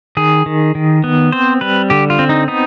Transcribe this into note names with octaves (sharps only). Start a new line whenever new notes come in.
D#3 G#4
D#3
D#3
B3
C4 C5
G3 B4
D3 G4
F4
C4
D#4
B3 D#4